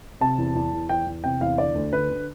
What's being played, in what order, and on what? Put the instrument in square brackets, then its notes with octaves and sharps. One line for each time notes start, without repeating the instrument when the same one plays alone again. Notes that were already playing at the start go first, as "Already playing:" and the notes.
[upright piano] C3 A5
E2
E2
E2
E2 G5
E2
C3 G5
E2 F5
D3 D5
D2
D3 B4
D3